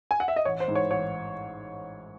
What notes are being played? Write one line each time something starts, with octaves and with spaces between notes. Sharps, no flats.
G#5
F#5
E5
D#5
A1 C#5
C5
G#2 E3
C#5
A1 C#5